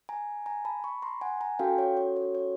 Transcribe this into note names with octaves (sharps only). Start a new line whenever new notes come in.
G#5 A#5
G#5 A#5
A5 B5
B5 C#6
A#5 C6
F#5 G#5
G#5 A#5
C#4 F#4 A4 F5 G5
C#5
C#5
C#5
C#5